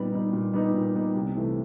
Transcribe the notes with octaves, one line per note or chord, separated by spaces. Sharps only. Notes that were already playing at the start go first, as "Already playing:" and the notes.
Already playing: A#2 G3 B3 D#4
G3 B3 D#4
A#2
G3 B3 D#4
A#2
G3 B3 D#4
C2
C3 E3 A3